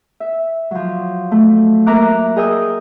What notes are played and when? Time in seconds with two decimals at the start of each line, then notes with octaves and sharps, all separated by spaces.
0.20 E5
0.71 F3 F#3
1.32 A3
1.86 A#3 A#4 E5 A#5 D6 F#6
2.36 G#4 A#4 D#5 G5 D#6 E6